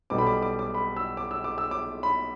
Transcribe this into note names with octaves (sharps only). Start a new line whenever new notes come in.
B1 B2 G3 D6
B5
D6
D6
D6
B5
E6
D6
E6
D6
E6
D6
B5